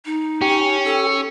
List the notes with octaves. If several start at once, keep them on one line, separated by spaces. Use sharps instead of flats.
D#4
C#4 G4
A4